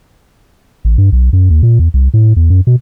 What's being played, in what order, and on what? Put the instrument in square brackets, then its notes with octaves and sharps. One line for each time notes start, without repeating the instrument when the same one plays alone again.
[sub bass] A1
G2
B1
F#2
D#2
A#2
E2
C2
A2
E2
F#2
B2